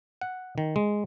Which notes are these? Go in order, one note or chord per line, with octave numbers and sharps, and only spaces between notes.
F#5
D#3
G#3